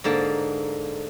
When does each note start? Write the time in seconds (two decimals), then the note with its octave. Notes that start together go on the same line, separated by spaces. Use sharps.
0.04 G#2 D3 A#3 A5